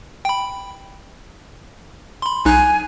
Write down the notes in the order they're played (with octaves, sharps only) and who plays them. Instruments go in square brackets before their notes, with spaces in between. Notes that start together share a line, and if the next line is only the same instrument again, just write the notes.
[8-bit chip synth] G5 B5
B5 C6
[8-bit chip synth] B1 D#4 F#6 [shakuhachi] G#5